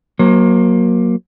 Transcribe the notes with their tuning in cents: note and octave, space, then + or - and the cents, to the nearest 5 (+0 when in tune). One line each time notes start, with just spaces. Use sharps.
F#3 +0 A#3 +15 C5 +35